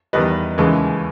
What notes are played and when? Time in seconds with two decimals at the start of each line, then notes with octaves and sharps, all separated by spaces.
0.13 E2 D#3 G3 B4 D#5
0.58 D#2 C#3 E3 G#3